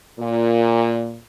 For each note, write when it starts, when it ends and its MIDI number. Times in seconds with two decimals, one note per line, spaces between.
0.20 1.17 46